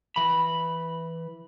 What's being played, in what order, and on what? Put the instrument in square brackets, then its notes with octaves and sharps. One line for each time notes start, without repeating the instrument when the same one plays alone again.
[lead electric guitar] E3 B5